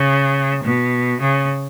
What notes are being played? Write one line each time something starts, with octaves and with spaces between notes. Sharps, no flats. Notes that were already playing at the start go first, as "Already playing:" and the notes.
Already playing: C#3
B2
C#3